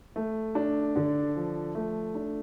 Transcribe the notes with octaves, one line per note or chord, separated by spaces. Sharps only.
A3
D4
D3
F3
A3
D4